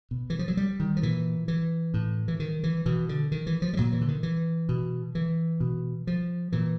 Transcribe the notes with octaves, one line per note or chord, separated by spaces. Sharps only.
B2
E3
F3
F#3
G3
D#3
F3
A#2 E3
E3
A2
E3
D#3
E3
B2 E3
D3
D#3
E3
F3
G3
A#2 F#3
E3
D3
D#3
E3
B2
E3
B2
F3
A#2 E3